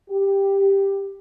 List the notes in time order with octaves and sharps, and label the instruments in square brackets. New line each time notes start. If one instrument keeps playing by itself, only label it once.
[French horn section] G4